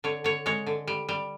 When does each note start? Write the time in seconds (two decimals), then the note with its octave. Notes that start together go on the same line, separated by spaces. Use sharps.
0.04 D3 C#5
0.24 D3 C#5
0.46 G#3 C#5
0.67 D3
0.88 G3
1.09 G3